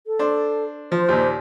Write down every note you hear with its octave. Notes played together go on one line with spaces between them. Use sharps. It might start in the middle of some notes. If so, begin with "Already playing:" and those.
A4
D4 C5
F3 C5
D#2 A#2